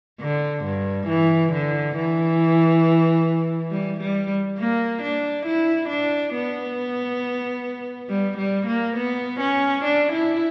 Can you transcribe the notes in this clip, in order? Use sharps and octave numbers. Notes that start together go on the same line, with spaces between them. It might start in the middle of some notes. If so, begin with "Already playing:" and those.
D3
G2
E3
D3
E3
G3
G3
A#3
D4
E4
D4
B3
G3
G3
A#3
B3
C#4
D4
E4